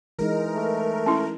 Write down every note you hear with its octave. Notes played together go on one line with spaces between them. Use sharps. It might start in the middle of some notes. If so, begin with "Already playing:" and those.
E3 G#3 D#4 A#4
A3
C#4 E4